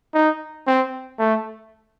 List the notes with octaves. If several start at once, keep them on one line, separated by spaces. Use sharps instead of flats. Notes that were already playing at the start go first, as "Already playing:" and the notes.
D#4
C4
A3